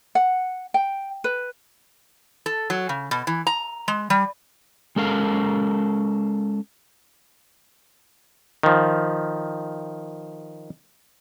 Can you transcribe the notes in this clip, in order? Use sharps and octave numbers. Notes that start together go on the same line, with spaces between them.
F#5
G5
B4
A4
F#3
C#3
B2
E3
A#5
G#3
G3
G#3 C#4 A4 A#4 F5
D#3 F3